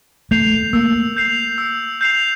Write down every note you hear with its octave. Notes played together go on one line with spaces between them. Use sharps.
A3 G6 C7 F7
A#3 E6
G6 C7 F7
E6
G6 C7 F7